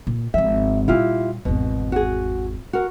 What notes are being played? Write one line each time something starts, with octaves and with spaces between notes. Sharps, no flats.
A#2
G#1 F3 E5
A#2 G3 E4 F4 G4
G#1 E2 B2
F#4 G#4
F#4 A#4